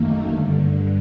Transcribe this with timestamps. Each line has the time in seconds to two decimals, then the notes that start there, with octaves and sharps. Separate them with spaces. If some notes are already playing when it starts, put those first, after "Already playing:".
Already playing: F#2 D#3 A3 A#3
0.28 G2 D3